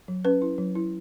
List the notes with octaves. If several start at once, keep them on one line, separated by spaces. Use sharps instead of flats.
F#3
C#4 B4
E4
F#3
E4